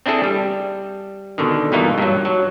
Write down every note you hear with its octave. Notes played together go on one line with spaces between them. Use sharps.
C4 D4 E4 G#4 A4
G3
B2 D3 D#3
G2 B2 E3 A#3 D#4 F4
G2 F#3
F#3